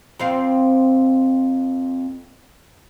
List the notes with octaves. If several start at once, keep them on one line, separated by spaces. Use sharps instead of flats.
F2 C4 F5